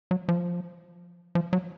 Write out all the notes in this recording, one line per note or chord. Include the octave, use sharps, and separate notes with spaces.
F#3
F3
F3
F#3